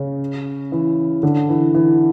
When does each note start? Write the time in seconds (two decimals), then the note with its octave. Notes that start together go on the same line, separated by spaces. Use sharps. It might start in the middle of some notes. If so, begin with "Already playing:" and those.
Already playing: C#3
0.72 E3
1.23 D3
1.49 E3
1.75 E3